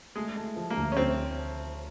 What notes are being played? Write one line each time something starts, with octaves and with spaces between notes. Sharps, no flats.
G#3 A3
A3
F3
A#3
D2
C#4
D2 C4